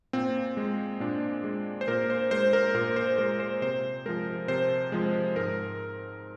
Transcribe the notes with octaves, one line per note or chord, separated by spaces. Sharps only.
A#2 C4
G#3
A#2 D4
G#3
C5
A#2 A#4
C5
G#3 C5
A#4
A#2 A#4
C5
G#3 A#4
C5
C3 C5
F3 G#3 A#4
C3 C5
F3 G#3
G#2 A#4